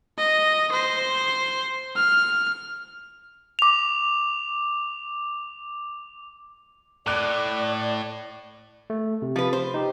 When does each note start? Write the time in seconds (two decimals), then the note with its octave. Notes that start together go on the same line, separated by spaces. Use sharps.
0.18 D#5
0.72 C5
1.96 F6
3.59 D6 F7
7.07 A2 D5 D6 F#6
8.90 A3
9.22 C3
9.36 F3 B4
9.53 C5
9.74 D#4 G4